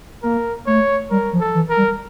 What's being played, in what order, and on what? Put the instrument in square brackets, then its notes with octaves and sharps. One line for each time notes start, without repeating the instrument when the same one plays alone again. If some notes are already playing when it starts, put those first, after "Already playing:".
[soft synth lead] A#3 [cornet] A#4
[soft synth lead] A3 [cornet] C#5
[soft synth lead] G3 [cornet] A#4
[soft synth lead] F3
[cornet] A4
[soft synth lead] E3
[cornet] A#4
[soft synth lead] G3